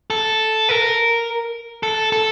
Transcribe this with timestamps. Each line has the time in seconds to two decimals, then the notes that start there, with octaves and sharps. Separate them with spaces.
0.10 A4
0.69 A#4
1.83 A4
2.12 A4